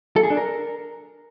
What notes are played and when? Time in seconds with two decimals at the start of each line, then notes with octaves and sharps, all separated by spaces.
0.16 A4
0.23 G#4
0.30 D4
0.37 A#4